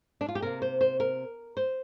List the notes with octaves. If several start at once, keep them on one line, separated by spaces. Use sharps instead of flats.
D4
F4
G4
C3 A#3 A#4
C5
C5
A#4
C5